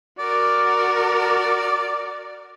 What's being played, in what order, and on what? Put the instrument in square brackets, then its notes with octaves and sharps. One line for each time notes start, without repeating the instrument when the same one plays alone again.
[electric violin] F#4 A#4 [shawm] D5